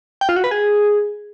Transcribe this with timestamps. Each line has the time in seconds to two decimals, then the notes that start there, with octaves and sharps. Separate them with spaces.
0.21 G5
0.29 F4
0.36 F#4
0.44 B4
0.51 G#4